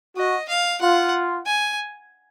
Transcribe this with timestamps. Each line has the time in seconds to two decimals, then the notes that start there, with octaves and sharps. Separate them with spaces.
0.17 F#4 D#5
0.48 F5
0.81 F4 F#5
1.46 G#5